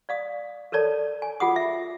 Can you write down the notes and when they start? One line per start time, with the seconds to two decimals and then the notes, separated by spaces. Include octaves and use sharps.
0.09 D5 F5 D#6
0.72 A4 A#4 C#5 D5 A5
1.22 G#5
1.40 F4 G#4 F#5 D#6
1.56 E5